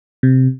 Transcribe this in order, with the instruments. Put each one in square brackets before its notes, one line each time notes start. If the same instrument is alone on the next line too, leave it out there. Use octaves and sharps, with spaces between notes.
[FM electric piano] C3